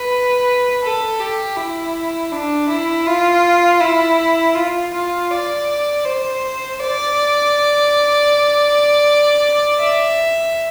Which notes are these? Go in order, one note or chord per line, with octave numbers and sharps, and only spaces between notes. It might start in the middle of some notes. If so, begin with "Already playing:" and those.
Already playing: B4
A4
G4
E4
D4
E4
F4
E4
F4
F4
D5
C5
D5
E5